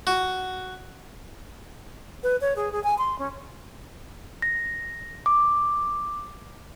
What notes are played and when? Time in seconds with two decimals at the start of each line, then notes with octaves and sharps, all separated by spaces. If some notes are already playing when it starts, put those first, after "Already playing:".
0.07 F#4
2.23 B4
2.41 C#5
2.56 G#4
2.72 G#4
2.84 G#5
2.98 C6
3.19 C#4
4.42 A#6
5.26 D6